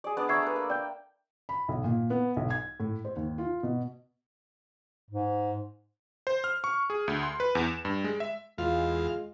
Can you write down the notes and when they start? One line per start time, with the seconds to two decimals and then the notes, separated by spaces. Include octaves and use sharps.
0.04 G#4 D5
0.17 B3 D4 D5
0.29 E5 A#5 C#6 G#6 C7
0.43 A3 B4
0.56 A#3
0.70 D5 G5 G6
1.49 B5
1.68 B1
1.84 A#2
2.10 B3
2.36 B1
2.50 G#6
2.80 A2
3.05 C5
3.16 D#2
3.38 F4
3.63 B2
5.11 G#2
6.27 C5
6.44 F6
6.64 C#6
6.90 G#4
7.08 D2
7.23 C6
7.40 B4
7.55 E2
7.68 E7
7.85 G2
8.04 G#3
8.20 E5
8.58 E2 G#3 F4 F5